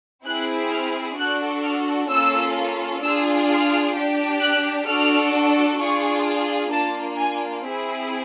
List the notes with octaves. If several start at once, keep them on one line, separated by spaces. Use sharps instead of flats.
C4 E4 G#4 F#6
F6
D4 F#4 A4 F#6
F6
A#3 C#4 F4 A4 E6
D4 F4 G#4 E6
F6
D4 G4
F#6
D4 F#4 A4 F6
D4 F4 G#4 C#6
A#3 D4 F4 A5
G#5
C4 E4 G#4